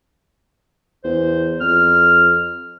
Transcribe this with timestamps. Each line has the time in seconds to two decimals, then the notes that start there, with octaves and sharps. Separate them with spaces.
1.04 E2 C5
1.61 F2 F6